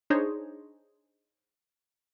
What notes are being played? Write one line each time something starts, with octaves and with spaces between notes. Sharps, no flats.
D4 D#4 G#4 C5 C#5 D#5